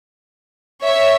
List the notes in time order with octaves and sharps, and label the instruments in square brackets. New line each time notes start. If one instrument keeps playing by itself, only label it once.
[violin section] C#5 E5